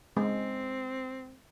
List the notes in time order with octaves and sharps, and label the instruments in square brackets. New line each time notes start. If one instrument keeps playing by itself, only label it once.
[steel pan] G#3 [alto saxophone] C4